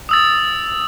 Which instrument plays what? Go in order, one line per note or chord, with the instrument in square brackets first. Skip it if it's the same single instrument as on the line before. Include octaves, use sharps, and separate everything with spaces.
[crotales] D#6 E6 A6